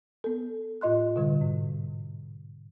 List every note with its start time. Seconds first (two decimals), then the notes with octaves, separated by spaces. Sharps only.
0.24 B3 A4
0.81 A2 F4 D#5 C6 F#6
1.16 B2 D3 G3
1.41 G#2